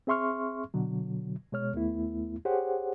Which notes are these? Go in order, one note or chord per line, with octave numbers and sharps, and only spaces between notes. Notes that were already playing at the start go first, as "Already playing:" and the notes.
C4 G#4 E5 C6 C#6 F6
B2 D3 F#3
B2 G#3 C#5 F6
D#2 A3 B3 E4
G4 G#4 C5 C#5 F#5